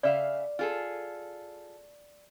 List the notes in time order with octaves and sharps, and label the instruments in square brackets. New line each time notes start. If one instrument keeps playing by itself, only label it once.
[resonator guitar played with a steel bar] C#3 E5 F5 [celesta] D5
[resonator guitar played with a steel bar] F4 G#4 A4